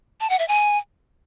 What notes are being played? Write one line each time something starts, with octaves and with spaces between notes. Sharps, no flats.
A5
F#5
E5
G#5